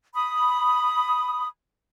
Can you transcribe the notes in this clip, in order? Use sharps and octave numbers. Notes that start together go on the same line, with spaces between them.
B5 D#6